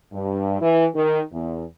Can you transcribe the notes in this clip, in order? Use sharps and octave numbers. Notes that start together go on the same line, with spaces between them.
G2
E3
D#3
E2